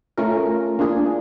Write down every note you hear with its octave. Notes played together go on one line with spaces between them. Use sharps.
A3 C#4 F4 A#4
A#3 D4 F4 G#4